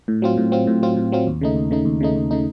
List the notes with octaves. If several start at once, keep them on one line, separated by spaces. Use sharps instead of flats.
A2
F#3 C4 F4
A2
F#3 C4 F4
A2
F#3 C4 F4
A2
F#3 C4 F4
D#2
C#3 A3 D#4
D#2
C#3 A3 D#4
D#2
C#3 A3 D#4
D#2
C#3 A3 D#4